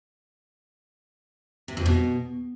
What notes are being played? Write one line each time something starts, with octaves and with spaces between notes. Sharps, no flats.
C3
F2
B2